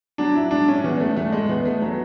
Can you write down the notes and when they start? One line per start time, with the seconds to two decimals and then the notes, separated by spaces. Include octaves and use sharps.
0.18 F#3 D4
0.35 E4
0.51 G#2 D4
0.68 C#4
0.84 E2 B3
1.00 A3
1.16 E2 A3
1.33 G#3
1.49 E2 B3
1.65 A3
1.82 F#3 B3